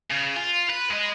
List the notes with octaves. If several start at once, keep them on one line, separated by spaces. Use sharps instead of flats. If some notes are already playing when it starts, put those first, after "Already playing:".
C#3
F4
B4
G#3 D#5